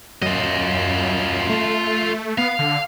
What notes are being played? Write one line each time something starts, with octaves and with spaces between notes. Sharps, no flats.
F#2 F4 D#5
A3
B3 F5
D3